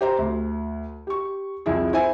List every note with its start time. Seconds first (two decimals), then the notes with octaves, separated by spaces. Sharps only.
0.01 G4 C5 A#5
0.19 D2
1.07 G4 C#6
1.66 C2 F2 E4 G#4
1.93 E4 C5 G#5